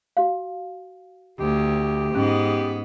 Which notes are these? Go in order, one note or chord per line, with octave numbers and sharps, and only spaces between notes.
F#4 F5
D2 G4
G#2 B3 C#4